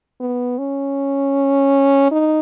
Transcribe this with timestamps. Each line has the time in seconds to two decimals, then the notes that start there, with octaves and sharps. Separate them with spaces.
0.20 B3
0.59 C#4
2.12 D#4